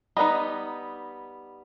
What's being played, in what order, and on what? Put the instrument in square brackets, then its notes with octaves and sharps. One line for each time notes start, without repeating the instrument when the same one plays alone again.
[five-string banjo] G3 B3 D#4 D#5